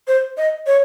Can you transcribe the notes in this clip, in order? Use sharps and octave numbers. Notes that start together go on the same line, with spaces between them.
C5
D#5
C#5